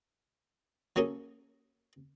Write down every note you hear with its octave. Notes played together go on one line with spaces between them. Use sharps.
F#3 A#3 C#4 G#4 A4